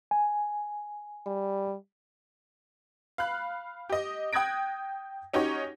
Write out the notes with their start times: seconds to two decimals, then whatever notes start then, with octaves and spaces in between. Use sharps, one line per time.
0.11 G#5
1.26 G3
3.18 F5 B5 F#6
3.89 G4 D#5
4.33 G5 D#6 F#6 G#6 A#6 D7
5.34 C#4 D#4 F#4 G4 C#5